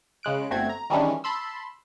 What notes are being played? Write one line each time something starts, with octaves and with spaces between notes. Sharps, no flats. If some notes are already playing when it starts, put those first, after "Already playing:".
C#3 G#3 F#6 D7
G1 A3 C4 F#4 G#6
A#5
D#3 E3 G3 G#3 C#4 D4
A5 B5 C6 E6